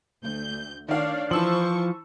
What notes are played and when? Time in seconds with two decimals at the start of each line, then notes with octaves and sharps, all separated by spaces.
0.22 D2 G6
0.88 D#3 D4 C#5 D5 F5
1.31 E3 F3 C5 A5 C#6 E6 F#7